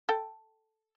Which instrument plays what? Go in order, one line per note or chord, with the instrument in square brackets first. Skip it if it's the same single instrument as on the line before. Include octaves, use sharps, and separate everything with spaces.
[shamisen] A4 G5